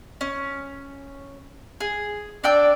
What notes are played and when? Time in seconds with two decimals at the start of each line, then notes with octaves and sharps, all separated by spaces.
0.21 C#4
1.80 G#4
2.44 D4 D5 G5 E6